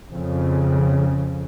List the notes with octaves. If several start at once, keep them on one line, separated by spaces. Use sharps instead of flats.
F2 C#3